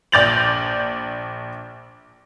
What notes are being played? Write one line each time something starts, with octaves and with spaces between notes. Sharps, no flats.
A#1 D5 G6 A6 F7 F#7